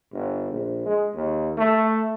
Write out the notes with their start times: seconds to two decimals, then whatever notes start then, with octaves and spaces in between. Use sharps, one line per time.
0.12 G1
0.52 A#1
0.85 G#3
1.15 D#2
1.58 A3